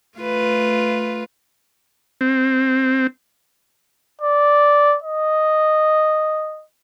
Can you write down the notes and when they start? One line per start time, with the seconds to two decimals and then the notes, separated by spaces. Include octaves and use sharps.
0.18 A3 F4 B4
2.21 C4
4.22 D5
5.02 D#5